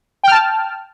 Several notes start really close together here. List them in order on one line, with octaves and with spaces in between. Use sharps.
G5 F6 A5